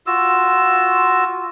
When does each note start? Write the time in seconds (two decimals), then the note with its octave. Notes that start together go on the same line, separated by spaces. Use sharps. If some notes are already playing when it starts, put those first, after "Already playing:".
0.07 F4 F#4 E6